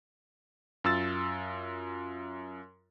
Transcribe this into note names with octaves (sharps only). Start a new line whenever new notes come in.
F#2 F4 E6 A6